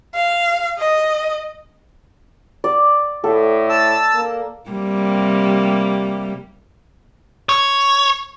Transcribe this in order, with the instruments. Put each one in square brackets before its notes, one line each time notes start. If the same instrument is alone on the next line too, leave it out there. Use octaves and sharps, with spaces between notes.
[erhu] F5
D#5
[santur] D5
[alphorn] A2 [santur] A4
[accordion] A5 E6
[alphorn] A#3
[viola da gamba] C3 G3 A#3
[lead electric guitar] C#5